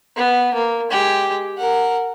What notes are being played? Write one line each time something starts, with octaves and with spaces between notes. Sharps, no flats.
B3
A#3
G#3 G4
A#4 F#5